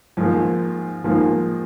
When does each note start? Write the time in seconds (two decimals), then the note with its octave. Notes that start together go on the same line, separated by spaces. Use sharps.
0.17 G#2 D#3 F3 A#3
1.04 G#2 D#3 F3 A#3